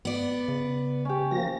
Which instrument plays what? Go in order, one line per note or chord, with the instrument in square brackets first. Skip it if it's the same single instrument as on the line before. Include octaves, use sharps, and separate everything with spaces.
[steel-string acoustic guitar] B3 D5
[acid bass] C#3
[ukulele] C#4 G4
[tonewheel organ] F3 A#3 A#6 [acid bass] F#4